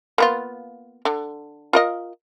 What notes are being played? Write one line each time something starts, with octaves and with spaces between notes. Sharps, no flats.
A#3 B3 F4
D3
F4 A#4 D#5